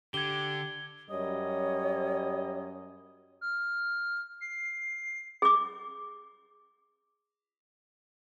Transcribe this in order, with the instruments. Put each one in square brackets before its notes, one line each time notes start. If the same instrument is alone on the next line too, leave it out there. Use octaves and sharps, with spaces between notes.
[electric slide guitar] D3 [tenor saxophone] G4 [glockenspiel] G#6 G7
[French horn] F#2 [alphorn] G3 [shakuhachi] C#5 [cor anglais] D#5
[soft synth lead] F6
C7
[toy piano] G#4 D6